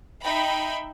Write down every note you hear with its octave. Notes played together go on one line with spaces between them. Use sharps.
D#4 E5 G5 B5